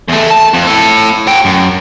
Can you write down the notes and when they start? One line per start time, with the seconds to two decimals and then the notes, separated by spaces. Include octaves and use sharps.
0.09 E2 A3
0.31 A5
0.54 F2
0.67 A2 A4
1.27 F#4 G5
1.45 F#2